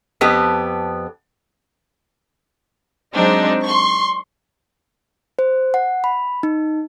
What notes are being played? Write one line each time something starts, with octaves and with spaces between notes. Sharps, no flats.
F2 B3 G4
F#3 G#3 C4 D4 D#4
C6 C#6
C5
F#5
B5
D#4